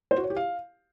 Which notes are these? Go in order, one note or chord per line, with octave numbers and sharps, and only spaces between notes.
C5
F#4
C#5
G4
F5